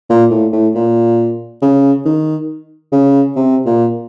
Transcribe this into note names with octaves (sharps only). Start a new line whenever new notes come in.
A#2
A2
A2
A#2
C#3
D#3
C#3
C3
A#2